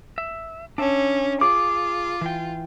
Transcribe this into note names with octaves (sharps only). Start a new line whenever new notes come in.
E5
C#4 D4 E5 A5
F4 G#4 D6
E3 G5